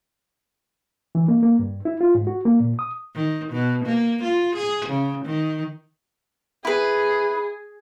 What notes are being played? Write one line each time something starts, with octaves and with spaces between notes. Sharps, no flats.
E3
A#3
A#3
G2
E4
F4
G#2
F#4
A#3
A#2
D#6
D#3
B2
A#3
F4
G#4
C#3
D#3
E4 G#4 B4